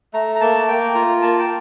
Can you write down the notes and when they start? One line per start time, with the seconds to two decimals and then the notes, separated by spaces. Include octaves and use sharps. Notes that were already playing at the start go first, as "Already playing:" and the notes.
0.14 A3 A#5
0.36 A#5
0.41 A#3 A5
0.68 A#3 G5
0.95 F4 A#5
1.22 A#3 A5
1.39 G5